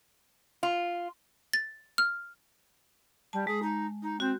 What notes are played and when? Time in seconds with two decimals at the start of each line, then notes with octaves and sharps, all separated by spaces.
0.63 F4
1.53 A6
1.98 F6
3.33 G3 A5
3.47 G#3 G#4
3.62 D#4
4.02 D#4
4.20 C4 F#4 G6